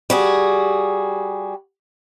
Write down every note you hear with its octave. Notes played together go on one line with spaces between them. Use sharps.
G3 F#4 G#4